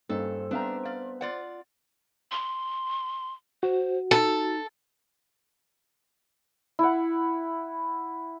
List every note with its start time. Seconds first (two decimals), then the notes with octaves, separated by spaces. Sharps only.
0.09 G2 A#3 C#4 D#4 A4 C5
0.51 B3 C4 D4 E5 F5 G5 A#5
0.85 D5 F5
1.21 F4 D5 F#5
2.32 C6
3.63 F#4 C5
4.11 D#4 A4
6.79 E4 F#5